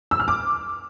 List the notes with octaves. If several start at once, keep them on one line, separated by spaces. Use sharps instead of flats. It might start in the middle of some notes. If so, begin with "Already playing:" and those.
E6
F6
D6